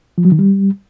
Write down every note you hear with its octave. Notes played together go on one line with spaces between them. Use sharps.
F3
F#3
D#3
G3